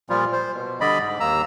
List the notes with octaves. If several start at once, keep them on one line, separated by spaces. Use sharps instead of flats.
A#2 F3 G3 F4
C5
B2
D3 G3 D5 D#5 B5
G#2
D#2 A#3 A#5 E6